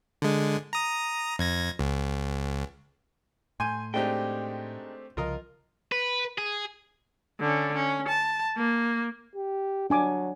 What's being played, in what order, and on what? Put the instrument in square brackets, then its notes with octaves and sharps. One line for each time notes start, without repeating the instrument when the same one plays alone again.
[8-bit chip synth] D3 G#3
A#5 D#6
F2 G#6 A#6
C#2
[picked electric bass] A2 [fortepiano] G#5 [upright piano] C6 G6 D#7
[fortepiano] G#3 D4 D#4 [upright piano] A3 C4 G4 [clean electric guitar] G5
[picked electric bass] C2 C#3 F3 [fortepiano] F4 A#4 D#5
[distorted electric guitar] B4
G#4
[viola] D3 C#4
C#4
A5
A#3
[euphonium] G4
[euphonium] F#3 [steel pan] D4 G#5 D6